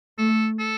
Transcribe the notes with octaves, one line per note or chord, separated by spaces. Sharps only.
A3 A4
A4